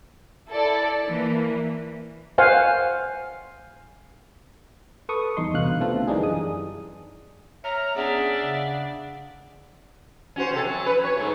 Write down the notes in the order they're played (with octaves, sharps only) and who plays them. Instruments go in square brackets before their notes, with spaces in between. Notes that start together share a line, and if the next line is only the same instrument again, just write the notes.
[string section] E4 A4 D5
E3 A#3
[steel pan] C5 F5 F#5 G#5
[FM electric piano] A4 B4 C#6 D#6
E2 G3 D#4 C6
C2 B2 D3 F5 F#6
D3 A3 B3 C4 F4 A4
D#3 E3 G3 D4 D#4 G#4
F#2 G#4 D#6
[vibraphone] C#5 [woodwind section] E5 F6 [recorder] A#5
[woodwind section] B3 C#4 G#4 [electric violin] D4 D5 [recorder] E5 [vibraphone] F#5
[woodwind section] C#3
[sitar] C#4 F#4 C5
C3 A4
F#3
C#4 B4
C#5
G#2 A3